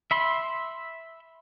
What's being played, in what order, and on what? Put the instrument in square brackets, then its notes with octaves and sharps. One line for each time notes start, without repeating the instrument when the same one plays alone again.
[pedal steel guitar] E5 B5 C6